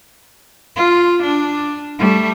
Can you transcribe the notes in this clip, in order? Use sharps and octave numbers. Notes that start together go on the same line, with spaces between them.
F4
D4
G3 A3